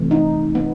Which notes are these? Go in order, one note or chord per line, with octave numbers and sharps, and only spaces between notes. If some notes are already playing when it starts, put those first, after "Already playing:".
Already playing: C3 E3 A3
D#4
B3